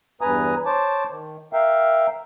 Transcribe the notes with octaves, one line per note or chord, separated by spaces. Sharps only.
E2 G2 B4 G#5 A#5 D#6
C5 C#5 A5 D6
D#3
A#4 E5 F5 G5